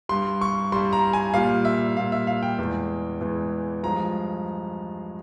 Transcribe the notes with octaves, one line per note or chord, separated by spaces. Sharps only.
G2 G3 C6
C#6
G2 G3 C6
A#5
G#5
A#2 G3 F5
E5
A#2 G3 F5
E5
F5
G5
E2 E3 G#3
E2 E3 G#3
G2 F3 G#3 A#5